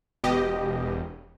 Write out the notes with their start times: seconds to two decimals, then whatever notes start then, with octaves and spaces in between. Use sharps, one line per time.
0.24 E1 B2 G4 D#5